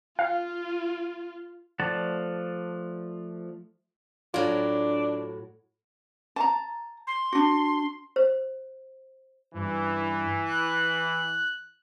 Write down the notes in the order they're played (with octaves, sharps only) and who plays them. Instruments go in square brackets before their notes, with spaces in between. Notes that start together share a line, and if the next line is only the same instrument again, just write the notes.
[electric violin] F4 [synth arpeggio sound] F5
[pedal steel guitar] F3 A3 D5 F#5 A5
[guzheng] A2 F#3 [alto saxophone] D4 [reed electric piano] F4
[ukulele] A5 A#5
[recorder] C6
[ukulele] D4 F#4
[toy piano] C5
[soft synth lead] G2 [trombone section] E3
[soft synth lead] F#6